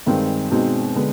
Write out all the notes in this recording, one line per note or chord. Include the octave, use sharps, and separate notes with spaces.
G2 D#3 G#3 C4 D#4
B2 G#3 C4 D#4
D3 G#3 B3